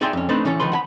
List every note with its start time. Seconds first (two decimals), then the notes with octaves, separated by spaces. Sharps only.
0.01 D#4 G#4 D5 E5 G5 C6
0.13 F2 C#4
0.29 A3 C4 D4 D#4 B4 D#5
0.45 E3 C#4 A4 C#5
0.60 C#2 D#3 F3 B4 C6
0.72 F#5 G#5 B5